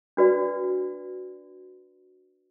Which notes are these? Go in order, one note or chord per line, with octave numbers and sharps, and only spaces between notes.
D4 F#4 B4 D5